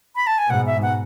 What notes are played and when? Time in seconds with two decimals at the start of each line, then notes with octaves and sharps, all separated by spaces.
0.16 B5
0.27 A5
0.38 G#5
0.50 G#2 B2 F#5
0.66 E5
0.82 F#5